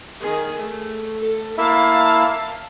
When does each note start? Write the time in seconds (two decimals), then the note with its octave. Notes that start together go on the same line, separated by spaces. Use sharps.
0.20 D#3 G#4
0.56 A3
1.20 A4
1.58 A#3 E4 E5 F5 A5